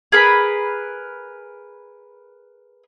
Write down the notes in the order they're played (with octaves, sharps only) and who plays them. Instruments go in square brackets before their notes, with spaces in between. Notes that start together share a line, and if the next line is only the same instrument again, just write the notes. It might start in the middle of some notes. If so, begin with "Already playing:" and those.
[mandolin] G#4 A#4 B4 B5